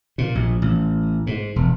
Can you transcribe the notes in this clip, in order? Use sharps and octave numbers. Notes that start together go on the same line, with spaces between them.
A#2
A#1
A1
G#2
E1